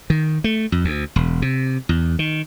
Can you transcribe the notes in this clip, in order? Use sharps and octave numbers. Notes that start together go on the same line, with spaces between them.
D#3
A3
F2
D2
E1
C3
E2
D#3